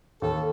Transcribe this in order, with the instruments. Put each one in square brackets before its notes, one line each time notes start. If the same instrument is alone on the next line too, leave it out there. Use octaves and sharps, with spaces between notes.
[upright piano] D#2 [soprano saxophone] A4